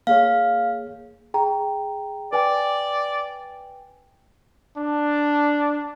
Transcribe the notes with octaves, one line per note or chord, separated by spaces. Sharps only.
A#3 G#4 C#5 F5
G#4 G5 A#5
B4 D5 G5 G#5
D4